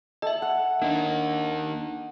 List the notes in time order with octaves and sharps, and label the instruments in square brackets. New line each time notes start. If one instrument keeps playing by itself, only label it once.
[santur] A4 [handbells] D#5 E5
[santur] F#5
[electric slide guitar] A#3 D#4 [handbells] D4